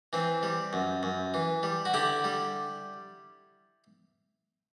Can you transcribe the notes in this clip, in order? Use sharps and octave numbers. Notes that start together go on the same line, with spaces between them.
E3 C4
G3
F#2
F#2
E3
G3
F#4
D3 E4 G4
G3